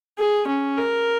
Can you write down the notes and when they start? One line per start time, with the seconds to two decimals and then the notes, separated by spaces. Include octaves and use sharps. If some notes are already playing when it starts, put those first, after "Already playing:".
0.18 G#4
0.47 C#4
0.78 A#4